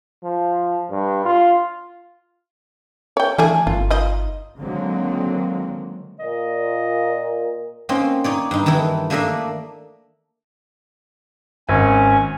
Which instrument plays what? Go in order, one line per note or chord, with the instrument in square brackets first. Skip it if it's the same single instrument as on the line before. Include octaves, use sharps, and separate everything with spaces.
[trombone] F3
G2
F4
[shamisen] C#5 G5
[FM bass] E3 [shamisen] A3 D4 G#4
[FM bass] G1 [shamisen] F4
[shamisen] D#4 F4 D#5
[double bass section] D3 D#3 F#3 G#3 A#3 C4
[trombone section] A#2 [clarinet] D#5
[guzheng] A#3 C4 C#4 D#4 A#4
D#4 C#5 D5
G2 D#4
D#3 E3 E4 A4
A3 A#3 D4 A4 D#5 E5
[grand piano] G#1 [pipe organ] C#4 G#5